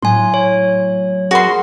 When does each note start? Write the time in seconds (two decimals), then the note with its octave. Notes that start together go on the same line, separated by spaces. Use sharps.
0.02 A2 F#3 G#5 C6
0.34 C#5
1.31 F#4 G#4 A#4 C6